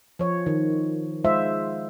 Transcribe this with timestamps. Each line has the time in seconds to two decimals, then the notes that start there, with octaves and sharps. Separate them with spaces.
0.19 F3 C#5
0.46 D#3
1.24 G#3 F4 C5 E5